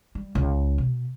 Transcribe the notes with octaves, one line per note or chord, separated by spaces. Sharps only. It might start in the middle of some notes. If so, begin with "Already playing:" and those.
G3
C#2
B2